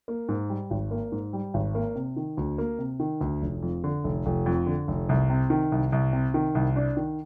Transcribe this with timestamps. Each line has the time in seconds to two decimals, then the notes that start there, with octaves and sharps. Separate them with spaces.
0.08 A#3
0.29 G#2
0.49 G3
0.71 G#1
0.91 A#3
1.12 G#2
1.33 G3
1.54 G#1
1.75 A#3
1.95 C3
2.16 D#3
2.37 D2
2.58 A#3
2.79 C3
3.00 D#3
3.21 D2
3.42 F1
3.62 F2
3.84 D3
4.04 F1
4.26 F1
4.46 F2
4.67 D3
4.88 F1
5.09 C2
5.30 C3
5.50 D#3
5.72 C2
5.92 C2
6.13 C3
6.34 D#3
6.55 C2
6.76 D4
6.97 D#3